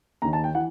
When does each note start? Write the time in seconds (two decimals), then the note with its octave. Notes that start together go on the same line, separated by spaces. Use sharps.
0.22 D#2 D#3 A#5
0.33 A5
0.44 G5
0.55 E3 F#5